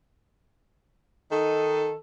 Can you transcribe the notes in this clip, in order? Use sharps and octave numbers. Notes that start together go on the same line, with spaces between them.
D#3 D#4 A4